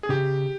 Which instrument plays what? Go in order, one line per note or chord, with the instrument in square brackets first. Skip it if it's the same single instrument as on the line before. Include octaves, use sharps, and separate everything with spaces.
[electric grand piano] G#4
[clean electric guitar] C#3 [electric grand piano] G4